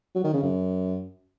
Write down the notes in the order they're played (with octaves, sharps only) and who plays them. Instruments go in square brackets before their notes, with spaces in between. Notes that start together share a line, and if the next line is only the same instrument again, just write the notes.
[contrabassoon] F#3
D#3
C#3
F#2